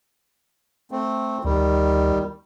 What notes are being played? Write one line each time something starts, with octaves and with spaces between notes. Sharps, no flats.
A3 C4
D2 D#3 G3